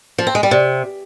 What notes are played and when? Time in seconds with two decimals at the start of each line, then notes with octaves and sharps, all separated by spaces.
0.18 F3
0.27 C4
0.35 G#3
0.43 G3
0.51 C3